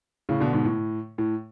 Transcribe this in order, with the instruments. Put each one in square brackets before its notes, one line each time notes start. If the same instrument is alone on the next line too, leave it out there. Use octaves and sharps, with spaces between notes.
[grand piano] A2 C#3
B2 D3
G#2 B2
A2
A2